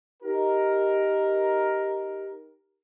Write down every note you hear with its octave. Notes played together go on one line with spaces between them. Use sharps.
D#4 G4 A#4